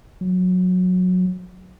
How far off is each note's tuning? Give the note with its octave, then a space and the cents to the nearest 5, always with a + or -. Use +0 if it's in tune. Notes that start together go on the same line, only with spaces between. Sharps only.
F#3 -20